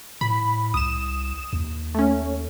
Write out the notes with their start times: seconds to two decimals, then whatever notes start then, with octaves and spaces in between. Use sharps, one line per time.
0.21 A2 B5
0.74 C2 D#6 E7
1.53 D#2
1.95 A3 C#4